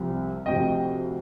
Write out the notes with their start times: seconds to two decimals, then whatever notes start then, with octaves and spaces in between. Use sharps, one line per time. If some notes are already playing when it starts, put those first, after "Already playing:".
Already playing: C2 C3 F3
0.46 D2 C3 F3 D#5 G5